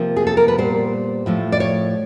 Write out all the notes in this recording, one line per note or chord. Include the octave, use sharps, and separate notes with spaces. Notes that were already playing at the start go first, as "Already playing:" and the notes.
Already playing: C3 F3 A#3
G#4
A4
A#4
B4
A#2 G3 B3 C5
A2 F3 A3
D5
C#5